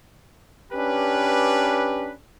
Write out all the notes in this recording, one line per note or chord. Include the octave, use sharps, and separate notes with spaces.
C#4 D4 G4 B4